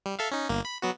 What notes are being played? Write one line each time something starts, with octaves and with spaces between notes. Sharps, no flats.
G3
A4 E5 F5
C#4 D#4
G1 A#3
B5
F#3 B3 F#4